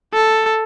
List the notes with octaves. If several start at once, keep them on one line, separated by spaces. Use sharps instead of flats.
A4